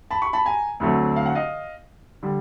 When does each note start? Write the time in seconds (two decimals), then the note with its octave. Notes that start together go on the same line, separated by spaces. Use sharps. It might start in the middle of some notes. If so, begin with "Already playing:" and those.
0.11 A5 B5
0.22 B5 C#6
0.33 A5 B5
0.45 G#5 A#5
0.80 D2 D3 F#3 A3 C4
1.16 F5
1.26 F#5
1.35 D#5 F5
2.23 D3 G3